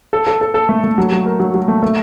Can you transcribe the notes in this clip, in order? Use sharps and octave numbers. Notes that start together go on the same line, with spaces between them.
A4
A4
A4
A4
A3
A3
F#3
F#3
A#4
F#3
F#3
A3
A3